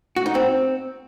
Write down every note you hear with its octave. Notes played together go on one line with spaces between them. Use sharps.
F#4
D#4
C4